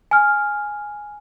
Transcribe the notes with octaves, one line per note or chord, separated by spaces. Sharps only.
G#5 F6